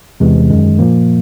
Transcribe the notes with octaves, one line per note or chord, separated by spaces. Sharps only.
E2 C3 E3 G#3
F#2 D#3 G#3
A#2 F3 A#3